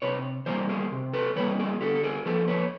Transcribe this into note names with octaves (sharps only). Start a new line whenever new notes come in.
C3 B4 C#5
E3 G3 A#3 A#4 C5
G#4 A#4
C3
A4 B4
E3 G3 A#3 B4 C#5
G#4 A#4
D3 G4 A4
A4
G#4 A#4
F3 A#3 A4 B4
B4 C#5